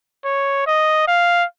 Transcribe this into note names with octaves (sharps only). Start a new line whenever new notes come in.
C#5
D#5
F5